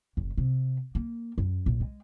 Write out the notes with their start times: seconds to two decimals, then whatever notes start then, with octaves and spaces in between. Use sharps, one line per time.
0.17 F#1
0.37 C3
0.95 A#3
1.38 F#2
1.66 A#1
1.80 G#3